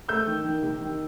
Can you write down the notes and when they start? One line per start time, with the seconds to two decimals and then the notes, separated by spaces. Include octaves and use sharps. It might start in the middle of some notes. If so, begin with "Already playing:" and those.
0.09 A3 E6 G6
0.27 D#3
0.44 D#3
0.63 C3
0.81 D#3